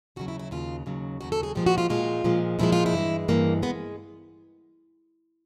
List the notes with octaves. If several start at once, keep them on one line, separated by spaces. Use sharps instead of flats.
D#2 C#3 F#3 F#4
E4
E4
D#2 C#3 F#3 F4
D#2 C#3 F#3
D#2 C#3 F#3 F#4
A4
G#4
A#2 F3 G#3 G4
F#4
F4
A#2 F3 G#3 F4
A#2 F3 G#3
A#2 F3 G#3 E4
F4
E4
G2 E3 G#3
G2 E3 G#3 A#3
G#3 B3